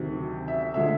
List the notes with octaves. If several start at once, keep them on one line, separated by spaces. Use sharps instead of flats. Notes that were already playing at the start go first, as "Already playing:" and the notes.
Already playing: D2 C3 D#3 F#3
E5
D3 F3 G#3 E5